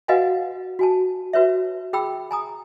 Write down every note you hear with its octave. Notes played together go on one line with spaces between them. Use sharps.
F#4 B4 D#5 F5 F#5 G#5
F#4 G#5 A5
F#4 B4 C#5 E5
G#4 G5 B5 E6
G#5 A#5 D#6